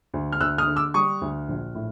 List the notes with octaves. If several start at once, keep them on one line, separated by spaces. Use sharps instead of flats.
D2
F6
D2 E6 F#6
D#6 F6
D3
D6 E6
G3 C#6 D#6
D2
A#1
A2